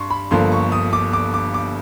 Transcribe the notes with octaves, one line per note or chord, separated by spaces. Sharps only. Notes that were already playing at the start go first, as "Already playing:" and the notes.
Already playing: G2 C6 C#6
B5
G1 G2 D3 F3 A#3 C6
C#6
D#6
D6
D6
D6
D6